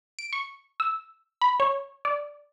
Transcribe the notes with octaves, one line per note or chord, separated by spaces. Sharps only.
D7
C#6
E6
B5
C#5
D5